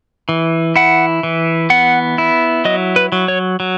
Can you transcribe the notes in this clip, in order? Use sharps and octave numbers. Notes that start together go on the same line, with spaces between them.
E3
E4 F#5
E3
B3 F#5
E4
F#3 D#5
B4
F#3
C#5
F#3